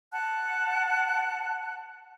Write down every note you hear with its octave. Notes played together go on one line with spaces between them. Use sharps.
F#5 A5 F#6